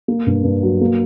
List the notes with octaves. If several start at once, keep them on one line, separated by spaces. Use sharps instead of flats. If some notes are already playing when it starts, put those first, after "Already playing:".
A#3
G2
G2
F#3
A#3